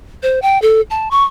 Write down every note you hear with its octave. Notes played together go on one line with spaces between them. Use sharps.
C5
G5
A4
A5
C#6